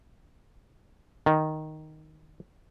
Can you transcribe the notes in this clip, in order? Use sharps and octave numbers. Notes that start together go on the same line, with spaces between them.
D#3